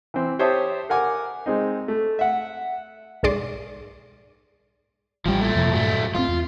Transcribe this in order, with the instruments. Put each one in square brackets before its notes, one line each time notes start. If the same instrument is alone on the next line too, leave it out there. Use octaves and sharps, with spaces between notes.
[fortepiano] E3 C4
G4 C5 C#5 E5 A5 D#6
A#4 F#5 G#5 D6
G#3 C4 D#4
A3
E5 F#5
[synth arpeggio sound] B1 G#2 G#4 D5 C6 D6
[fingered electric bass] A1 G3 [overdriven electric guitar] F3 G4
[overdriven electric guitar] A#2 A3
[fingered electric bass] F2 C3 F3
[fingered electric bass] G2 A#2 [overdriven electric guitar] F#3 A3
[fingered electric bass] G#3 C4 [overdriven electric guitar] F4
[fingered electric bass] E2